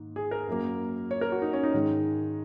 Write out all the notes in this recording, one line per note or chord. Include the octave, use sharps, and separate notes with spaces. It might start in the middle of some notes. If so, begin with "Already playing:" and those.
Already playing: G#2 D#3 A#3
G#4
A#4
F#2 F#3 A#3
C#5
A#4
F#4
D#4
C#4
D#4
G#2 D#3 G#3